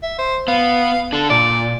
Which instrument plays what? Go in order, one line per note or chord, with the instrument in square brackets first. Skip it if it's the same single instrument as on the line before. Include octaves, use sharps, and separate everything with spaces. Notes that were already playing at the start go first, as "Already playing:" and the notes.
[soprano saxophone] E5
C5
[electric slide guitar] B3 [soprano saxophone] F5
[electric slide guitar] D3 D4 [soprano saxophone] A4
[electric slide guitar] A#2 [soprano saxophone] D5